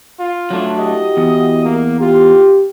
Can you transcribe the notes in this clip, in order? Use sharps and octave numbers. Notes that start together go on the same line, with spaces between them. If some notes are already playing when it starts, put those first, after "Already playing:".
F4
F#3 A3 D4
E4 F#4 G4 D#5
E2
A#3
F4 G4